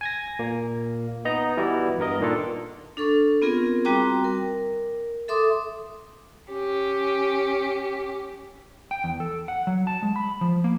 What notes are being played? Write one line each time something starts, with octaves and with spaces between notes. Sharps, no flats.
G#5 G#6 A#6
A#2 A#3
B3 D#4 D#5 A#5
E3 G3 B3 E4 F#4 D5
G2 B3 A#4 D#5
A#2 D#3 A#3 D4 F4 A4
D4 A4 C#6
B3 C4 F4 G#4 A#4
G3 C4 F#4 G5 A#5 D6
A#4
A4 E5 C6 D6 D#6
C#4 G4
G5
E2
A4
F#5
F#3
A5
G#3
B5
F3
A#3